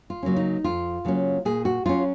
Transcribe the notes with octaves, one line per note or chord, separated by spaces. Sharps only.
F4
C#3 F#3 A#3 C#4
D#4
F2 F4
C#3 F#3 A#3 C#4
A#2 G#4
F#4
F#3 C#4 F4